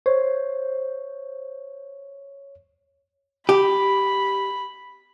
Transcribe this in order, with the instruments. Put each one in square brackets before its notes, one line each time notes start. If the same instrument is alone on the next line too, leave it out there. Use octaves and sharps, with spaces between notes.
[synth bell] C5 [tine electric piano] C#5
[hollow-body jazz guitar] G4 [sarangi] B5